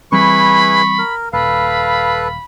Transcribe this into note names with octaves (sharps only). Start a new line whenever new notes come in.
E3 G3 C4 E4 G#4 B4 B5 C#6
A#4
D#1 A4 B4 F5 B5